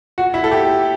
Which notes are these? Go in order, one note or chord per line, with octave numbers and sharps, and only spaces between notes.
F#4
E4
A4
G4